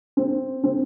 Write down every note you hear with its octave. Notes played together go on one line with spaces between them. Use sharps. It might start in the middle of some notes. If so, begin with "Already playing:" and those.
C4
C4